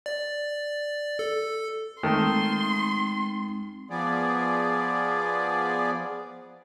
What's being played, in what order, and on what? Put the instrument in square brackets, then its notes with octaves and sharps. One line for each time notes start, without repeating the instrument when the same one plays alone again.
[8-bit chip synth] D5
A4
[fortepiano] D#3 A3 [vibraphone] G#3 C4 D#4 [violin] C6
[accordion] F3 B3 G#4 D5